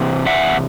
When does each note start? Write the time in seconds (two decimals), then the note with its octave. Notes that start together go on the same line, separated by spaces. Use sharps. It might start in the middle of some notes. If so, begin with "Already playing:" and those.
Already playing: C3 E3
0.26 E5 F#5